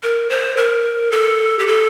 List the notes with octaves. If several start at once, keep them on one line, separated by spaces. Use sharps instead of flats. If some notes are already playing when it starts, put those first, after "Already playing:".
A#4
C5
A#4
A4
G4
A4